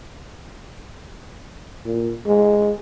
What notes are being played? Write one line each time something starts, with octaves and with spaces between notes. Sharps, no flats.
A#2
G#3